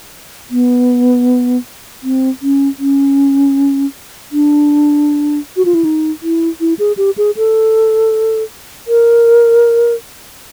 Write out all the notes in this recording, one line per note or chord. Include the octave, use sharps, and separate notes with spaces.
B3
C4
C#4
C#4
D4
F#4
F4
E4
D#4
E4
E4
G#4
G4
G#4
A4
A#4